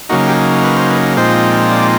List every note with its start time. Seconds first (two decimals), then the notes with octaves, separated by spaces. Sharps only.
0.09 C#3 F#3 A#3 D#4 F#4
0.28 G4
0.64 B4
0.76 C5
0.90 B4
1.17 A#2 F3 G#3 C4 D#4 C5
1.71 D5